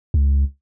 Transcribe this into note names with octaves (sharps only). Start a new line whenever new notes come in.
C#2